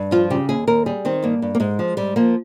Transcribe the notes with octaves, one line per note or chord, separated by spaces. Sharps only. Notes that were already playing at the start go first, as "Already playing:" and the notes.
Already playing: G2
F3 F4
C#3 G4
D#2 G#4
D#2 A#4
G3 G#4
D#3 C4
G2 A#3
G2
A#3
G#2 G#3
F3
G#2 G3
F3 A#3